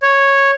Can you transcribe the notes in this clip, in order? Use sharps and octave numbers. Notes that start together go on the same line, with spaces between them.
C#5